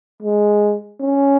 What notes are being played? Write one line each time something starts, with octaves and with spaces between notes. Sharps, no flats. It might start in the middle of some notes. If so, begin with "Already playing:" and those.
G#3
C#4